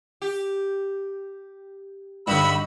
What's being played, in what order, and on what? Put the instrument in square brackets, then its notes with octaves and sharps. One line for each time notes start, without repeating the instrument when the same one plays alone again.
[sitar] G4
[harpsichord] G2 D3 [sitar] F#3 D#4 F#4 [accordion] B5 E6